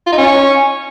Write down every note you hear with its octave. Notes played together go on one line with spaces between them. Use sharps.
F4
D#4
C#4